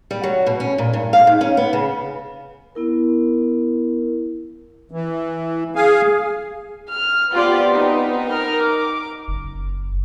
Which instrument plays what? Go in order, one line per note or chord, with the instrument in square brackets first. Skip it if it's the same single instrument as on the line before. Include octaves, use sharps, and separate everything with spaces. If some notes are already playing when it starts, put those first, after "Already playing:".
[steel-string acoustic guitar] G3
F#3
B2
C#4
A#2
G2
F5
G#2
C#4
B3
C#3
[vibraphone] B3 E4 A#4
[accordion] E3
G#4 F5 G#5
[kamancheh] F6
[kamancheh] B3 C4 [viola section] F4 G4 D5
[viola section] D#4
[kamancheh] A#4 F6
D6
[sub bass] F#1